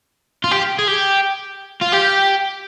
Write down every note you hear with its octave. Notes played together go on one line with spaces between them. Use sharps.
F4
G4
G#4
G4
F4
G4